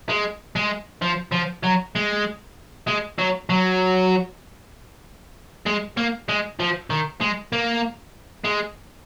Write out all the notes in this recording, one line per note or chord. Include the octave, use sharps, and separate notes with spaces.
G#3
G#3
F3
F3
F#3
G#3
G#3
F#3
F#3
G#3
A#3
G#3
F3
D#3
G#3
A#3
G#3